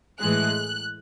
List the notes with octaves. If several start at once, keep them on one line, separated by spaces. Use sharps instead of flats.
A2 E3 G#3 F#6